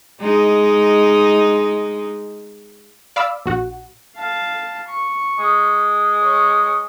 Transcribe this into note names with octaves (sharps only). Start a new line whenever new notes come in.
G#3 D#4
D5 F5 B5 D6 E6
A#1 F#4 F#5
F5 A5
C#6
G#3
C#5